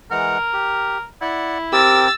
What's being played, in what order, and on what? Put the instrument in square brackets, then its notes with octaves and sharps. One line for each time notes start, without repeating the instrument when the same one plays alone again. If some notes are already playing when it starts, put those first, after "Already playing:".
[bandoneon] E3 G#3 F#5 [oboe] A#4
[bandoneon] G4
[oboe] E4 [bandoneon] D5 F#5
[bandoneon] C4 A#4 [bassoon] G4 [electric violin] E6 A6